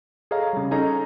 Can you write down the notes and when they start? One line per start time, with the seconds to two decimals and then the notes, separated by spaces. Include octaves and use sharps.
0.31 G#4 A4 C#5 D#5 F5 A#5
0.53 C#3 G3
0.71 C#4 D#4 G#4 A4 D#5 A#5